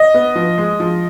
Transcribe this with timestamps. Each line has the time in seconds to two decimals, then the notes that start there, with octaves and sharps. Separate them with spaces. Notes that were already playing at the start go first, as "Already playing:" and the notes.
Already playing: D#5
0.14 B3
0.35 F3
0.58 G#3
0.80 F3